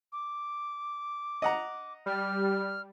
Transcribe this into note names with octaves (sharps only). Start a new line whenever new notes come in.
D6
D#5 F#5 A#5
G3 F6